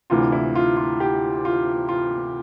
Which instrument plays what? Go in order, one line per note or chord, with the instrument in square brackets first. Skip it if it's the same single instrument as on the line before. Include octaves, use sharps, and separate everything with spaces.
[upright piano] D2 C3 E3 F4
E4
F4
F4
G4
F4
F4